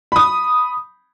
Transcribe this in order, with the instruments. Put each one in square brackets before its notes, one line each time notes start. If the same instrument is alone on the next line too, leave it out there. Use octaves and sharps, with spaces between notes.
[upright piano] B5 D#6